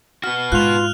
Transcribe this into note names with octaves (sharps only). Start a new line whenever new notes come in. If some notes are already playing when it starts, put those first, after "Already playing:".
B3 F#4 F6
G#2 F4 F#6 F7